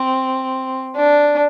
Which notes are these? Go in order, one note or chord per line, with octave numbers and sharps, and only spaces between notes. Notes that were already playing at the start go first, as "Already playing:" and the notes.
Already playing: C4
D4